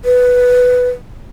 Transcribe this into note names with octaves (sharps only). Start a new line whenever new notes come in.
B4